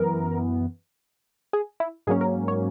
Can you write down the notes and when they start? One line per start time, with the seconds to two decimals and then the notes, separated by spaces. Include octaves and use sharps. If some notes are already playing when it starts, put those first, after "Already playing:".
Already playing: F#2 E3 B3 A#4
1.53 G#4
1.80 E4
2.07 G#2 F#3 A#3 C#4 G#4
2.21 A#4
2.48 C#5